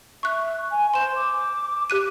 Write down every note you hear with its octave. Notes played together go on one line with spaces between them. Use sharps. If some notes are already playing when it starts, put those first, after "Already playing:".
E5 C#6 F#6
G#5
C5 C6 E7
D6
G4 F#6 D#7